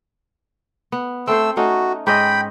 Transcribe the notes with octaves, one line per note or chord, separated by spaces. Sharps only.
B3
A3 C4 A4 C5 E6
A3 C#4 D#4 F#4
G#2 C#4 D#5 G5 B5